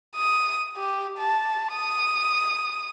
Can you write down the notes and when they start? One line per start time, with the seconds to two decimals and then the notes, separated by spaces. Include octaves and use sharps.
0.16 D#6
0.77 G4
1.19 A5
1.73 D#6